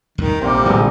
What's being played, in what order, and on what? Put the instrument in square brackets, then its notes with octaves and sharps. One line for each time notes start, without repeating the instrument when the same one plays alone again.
[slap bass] E2 A2 G3 [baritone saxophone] D#3
[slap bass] A#1 [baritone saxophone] C3 [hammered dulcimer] G3 A#3 C4
[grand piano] D1 A#1 [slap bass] D3 G#3 B3